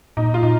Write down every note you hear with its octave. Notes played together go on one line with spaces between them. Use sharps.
A#2 D#4
F4
A#2 D#4